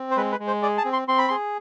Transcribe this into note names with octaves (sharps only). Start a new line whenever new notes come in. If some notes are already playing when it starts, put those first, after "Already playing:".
Already playing: C4
C5
G#3 B4
B4
G#3
C5
G#4 D5
A5
C4
C6
C4 C6
B5
G#4 C6